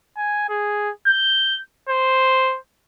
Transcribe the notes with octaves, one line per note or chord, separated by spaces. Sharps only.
G#5
G#4
G6
C5